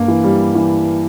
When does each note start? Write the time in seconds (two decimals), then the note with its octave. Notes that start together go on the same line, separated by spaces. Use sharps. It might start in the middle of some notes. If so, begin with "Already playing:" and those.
Already playing: G2 A#3
0.08 E3
0.24 G3
0.55 E3